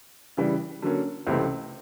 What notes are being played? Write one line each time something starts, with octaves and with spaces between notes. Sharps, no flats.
C#3 E3 G3
D3 F#3 A#3 C#4
C#2 C3 E3 A3 C4